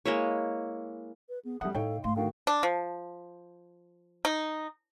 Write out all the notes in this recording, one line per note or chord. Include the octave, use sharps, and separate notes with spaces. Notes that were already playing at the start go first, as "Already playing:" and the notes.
G#3 A#3 E4 C#5
B4
B3 G#4
F3 G3 A3 E5 F#5 D#6
A2 D#4 E4 A4 C#5 F5 G5
G#2 A3 F5 C6
D3 D#3 F#4 F5 G5
D4
F3
D#4